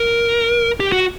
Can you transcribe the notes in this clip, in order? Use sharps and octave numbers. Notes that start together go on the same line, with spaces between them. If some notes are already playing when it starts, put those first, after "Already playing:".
Already playing: A#4
G4
F#4